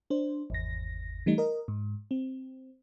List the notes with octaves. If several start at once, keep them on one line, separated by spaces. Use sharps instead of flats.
D4 C5
G#1 E2 A#6
E3 G3 A3 D#4
A#4 D#5
G#2
C4